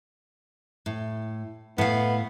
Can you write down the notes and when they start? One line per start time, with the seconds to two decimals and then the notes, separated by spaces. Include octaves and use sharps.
0.86 A2
1.78 A2 B3 F5